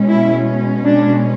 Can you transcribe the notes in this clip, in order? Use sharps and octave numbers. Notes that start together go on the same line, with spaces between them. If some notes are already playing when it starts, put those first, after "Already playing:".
Already playing: B2 G#3 C#4
E4
D4